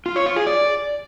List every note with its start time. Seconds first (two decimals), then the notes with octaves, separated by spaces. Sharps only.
0.06 F4
0.16 C#5
0.26 F4
0.36 G#4
0.47 D5